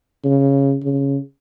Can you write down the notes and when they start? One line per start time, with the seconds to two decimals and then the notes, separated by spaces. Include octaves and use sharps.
0.24 C#3
0.83 C#3